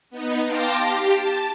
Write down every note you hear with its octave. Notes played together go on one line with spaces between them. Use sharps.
B3 D#4
F5 G5 A5 C6 D6 A#6
G4
A5